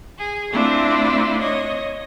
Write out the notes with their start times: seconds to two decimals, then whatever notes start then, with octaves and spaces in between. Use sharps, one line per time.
0.19 G#4
0.52 A3 C4 D4 E4 F4
1.40 C#5 D#5